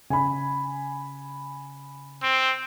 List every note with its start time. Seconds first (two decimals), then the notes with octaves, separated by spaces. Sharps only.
0.10 C#3 G#5 B5
2.22 C4